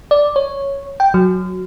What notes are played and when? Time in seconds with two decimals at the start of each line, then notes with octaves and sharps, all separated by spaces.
0.11 D5
0.36 C#5
1.00 G5
1.14 F#3